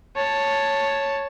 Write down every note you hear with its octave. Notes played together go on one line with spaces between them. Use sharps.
C#5 A5